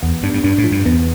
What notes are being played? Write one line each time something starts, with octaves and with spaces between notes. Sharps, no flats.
E2 B3
G2 D4
G2
G2 D4
A2
F3
G2
E2 B3